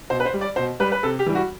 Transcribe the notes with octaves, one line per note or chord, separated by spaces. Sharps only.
B2 C5
B4
C5
G3
D5
B2 C5
G3 B4
B4
C3 A4
G4
E3 G3
F#4